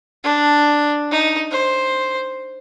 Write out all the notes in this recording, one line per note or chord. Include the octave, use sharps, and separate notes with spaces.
D4
D#4
C5